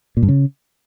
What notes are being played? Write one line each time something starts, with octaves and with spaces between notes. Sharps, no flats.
A#2
G2
C#3